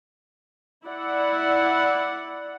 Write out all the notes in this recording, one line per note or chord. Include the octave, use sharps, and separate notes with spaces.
E4 D5 F#5